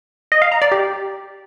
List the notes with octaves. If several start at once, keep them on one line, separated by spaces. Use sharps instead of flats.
D#5
F5
A#5
D5
G4